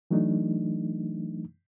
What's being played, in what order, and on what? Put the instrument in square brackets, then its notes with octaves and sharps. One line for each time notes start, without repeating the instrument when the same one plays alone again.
[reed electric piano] E3 F#3 A3 D4 D#4